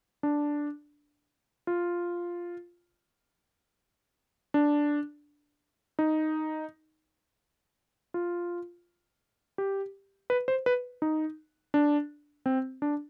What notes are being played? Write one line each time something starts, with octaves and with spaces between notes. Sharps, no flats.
D4
F4
D4
D#4
F4
G4
B4
C5
B4
D#4
D4
C4
D4